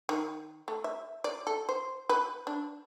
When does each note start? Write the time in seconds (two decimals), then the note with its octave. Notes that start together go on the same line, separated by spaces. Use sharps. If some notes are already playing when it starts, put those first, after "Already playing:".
0.09 D#3
0.68 A3
0.84 E5
1.24 D5
1.47 A4
1.69 C5
2.09 B4
2.47 D4